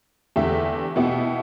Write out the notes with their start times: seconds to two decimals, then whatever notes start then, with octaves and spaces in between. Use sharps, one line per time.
0.36 E2 D3 A3 G4 E5
0.96 B2 B3 E4 G4